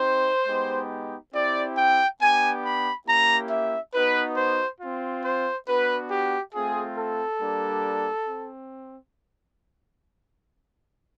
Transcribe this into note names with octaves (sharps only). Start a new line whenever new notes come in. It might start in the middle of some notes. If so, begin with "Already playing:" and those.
Already playing: C4 D#4 G4 C5
G#3 B3 D#4 G4
C4 E4 G4 D5
G5
B3 D4 G4 G#5
B5
A#3 C#4 E4 G4 A#5
E5
B3 D#4 F#4 B4
C5
C4 F4
C5
B3 D4 F#4 B4
G4
A3 C4 F4 G#4
A4
G3 A#3 D4
C4